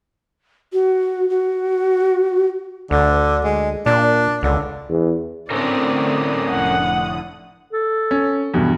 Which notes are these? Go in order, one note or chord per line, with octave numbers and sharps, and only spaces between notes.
F#4
F#4
D2 D3
G#3
A#2 D4
C#2 D3
E2
A2 D3 C4 C#4 A4 A#4 D5 D#6
F1 F#5
A4
C#4
E2 G2 B2